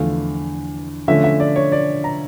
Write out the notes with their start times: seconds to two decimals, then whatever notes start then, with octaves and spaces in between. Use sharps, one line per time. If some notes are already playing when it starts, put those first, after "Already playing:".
Already playing: E2 D3 F3 A3 F5
1.08 D3 F3 A3 C#4 E5
1.24 E5
1.40 D5
1.56 C#5
1.72 D5
2.04 A#5